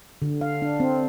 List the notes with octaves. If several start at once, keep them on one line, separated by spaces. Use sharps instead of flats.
D3
F5
D4
C4